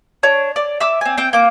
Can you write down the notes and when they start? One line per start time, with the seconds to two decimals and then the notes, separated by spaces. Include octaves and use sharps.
0.23 D4 C#5
0.56 D5
0.80 E5 D6 E6
1.01 C4 G#5
1.18 C4 G5
1.33 A#3 D6